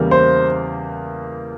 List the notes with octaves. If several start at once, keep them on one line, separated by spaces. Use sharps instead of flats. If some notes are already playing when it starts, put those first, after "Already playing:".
Already playing: E2 C#3 E3 G3 A#3
C5